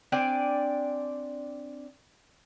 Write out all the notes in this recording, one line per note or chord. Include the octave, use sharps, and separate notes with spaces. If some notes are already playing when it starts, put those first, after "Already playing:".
C4 D4 D5 G#5